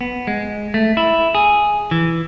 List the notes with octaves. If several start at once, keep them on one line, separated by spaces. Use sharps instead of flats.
B3
G#3
A3
E4
G#4
E3